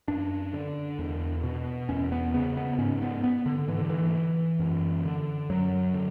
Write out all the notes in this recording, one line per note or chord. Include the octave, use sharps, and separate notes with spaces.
F#2 D4
D3
E2
B2
E2 C#4
B3
C#3 B3
B3
G#2 C#4
B3
B3
D3
G#2 E3
D3
E3
F#2
D3
F#2 F#3
D3